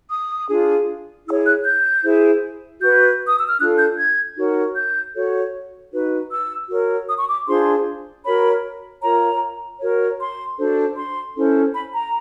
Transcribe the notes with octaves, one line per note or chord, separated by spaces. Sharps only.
D#6
D4 F4 G#4
E4 G#4 C#5 E6
F#6
G6
E4 G#4 C5
F#4 B4 G6
D#6
E6
F6
D4 F4 A4 F#6
G6
G#6
D#4 F#4 A#4 C#5
G6
F#4 A4 C#5
D#4 F#4 B4
E6
F#4 A#4 C#5
D#6
C#6
D6
D4 F4 G#4 C5 C6
F#4 A#4 C#5 B5
F4 A#4 C#5 A#5
F#4 A#4 C#5
C6
D4 F#4 A4 C5
C6
C#4 E4 A4 C5
B5
A#5